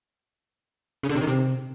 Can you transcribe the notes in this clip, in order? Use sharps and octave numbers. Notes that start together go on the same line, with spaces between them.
C#3
D3
C3
D#3
C3